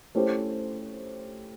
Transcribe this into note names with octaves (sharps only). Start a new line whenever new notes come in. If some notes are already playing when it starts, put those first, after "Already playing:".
A3 C#4 E4 G4 C5